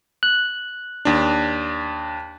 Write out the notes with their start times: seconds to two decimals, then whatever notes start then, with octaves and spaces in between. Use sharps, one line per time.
0.23 F#6
1.05 D#2 D4